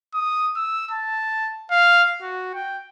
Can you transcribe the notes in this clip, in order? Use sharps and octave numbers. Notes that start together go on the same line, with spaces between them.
D#6
E6
A5
F5
F#4
G5